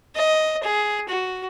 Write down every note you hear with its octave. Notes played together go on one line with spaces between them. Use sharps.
D#5
G#4
F#4